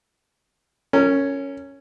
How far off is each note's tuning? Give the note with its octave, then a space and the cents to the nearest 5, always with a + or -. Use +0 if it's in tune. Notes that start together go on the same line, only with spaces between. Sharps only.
C#4 +0 A#4 -30